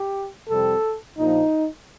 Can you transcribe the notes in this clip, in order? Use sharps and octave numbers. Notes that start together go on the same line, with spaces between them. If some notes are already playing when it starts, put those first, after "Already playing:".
Already playing: G4
F2 C3 G3 C4 A4
A#1 A#2 F3 A#3 D#4